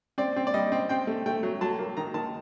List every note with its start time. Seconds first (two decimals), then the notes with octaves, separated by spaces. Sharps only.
0.18 C4 D5
0.36 C4
0.47 D5
0.54 G3 D#5
0.72 C4
0.89 C4 G5
1.07 A3
1.26 A3 G5
1.43 F#3
1.61 F#3 A5
1.79 A#3
1.97 D#3 A#5
2.14 D#3 A5